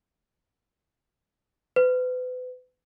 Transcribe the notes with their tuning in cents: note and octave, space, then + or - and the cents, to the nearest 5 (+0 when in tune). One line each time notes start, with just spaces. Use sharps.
B4 +35